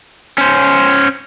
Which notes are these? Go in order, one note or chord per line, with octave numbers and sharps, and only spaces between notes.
C#4 C5